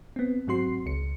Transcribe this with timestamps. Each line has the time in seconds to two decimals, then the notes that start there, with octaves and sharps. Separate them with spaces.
0.16 B3 C4
0.47 G#2 F#3 C4 F#4 C6 C7
0.86 C#2 C#7